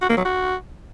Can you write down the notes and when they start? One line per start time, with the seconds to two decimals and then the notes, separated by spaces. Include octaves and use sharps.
0.02 F#4
0.10 A#3
0.17 F#3
0.25 F#4